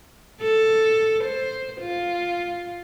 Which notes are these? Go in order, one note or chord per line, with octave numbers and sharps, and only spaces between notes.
A4
C5
F4